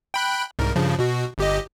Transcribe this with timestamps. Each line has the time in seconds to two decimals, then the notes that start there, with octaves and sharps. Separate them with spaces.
0.14 G5 B5 F#6
0.59 C2 G#2 A#4
0.76 G2 C#3 F3
0.99 B2 F#4
1.38 G1 G4 D#5